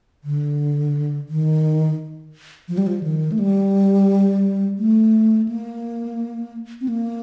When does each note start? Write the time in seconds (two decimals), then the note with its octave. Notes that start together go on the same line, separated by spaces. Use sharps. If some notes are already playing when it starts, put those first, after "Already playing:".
0.24 D3
1.29 D#3
2.68 F3
2.78 G3
2.87 F3
3.03 D#3
3.32 A3
3.39 G3
4.78 A3
5.48 A#3
6.81 C4
6.88 A#3